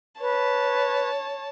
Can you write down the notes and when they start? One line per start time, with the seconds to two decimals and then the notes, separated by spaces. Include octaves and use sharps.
0.21 B4 C#5 A5